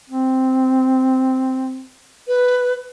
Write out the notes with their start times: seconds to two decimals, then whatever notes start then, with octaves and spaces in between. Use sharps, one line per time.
0.10 C4
2.28 B4